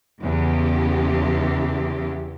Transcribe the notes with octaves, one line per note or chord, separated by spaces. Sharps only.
E2 C#3 G4